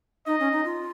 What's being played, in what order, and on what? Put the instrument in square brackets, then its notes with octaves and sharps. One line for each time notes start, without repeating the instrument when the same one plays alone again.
[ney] D#4 [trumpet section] D#5
[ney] C#4
D#4
F4